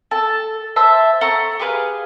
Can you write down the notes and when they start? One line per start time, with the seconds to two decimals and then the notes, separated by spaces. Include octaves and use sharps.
0.11 A4 A5
0.76 C5 E5 A5
1.21 A4 F#5 A#5 C#6
1.59 G4 G#4 B4 F5